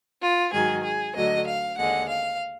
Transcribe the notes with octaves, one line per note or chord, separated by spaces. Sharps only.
F4
G#2 D#3 F#3 G#4
G#4
D2 D3 F#3 D#5
F5
D#2 D3 G#3 F#5
F5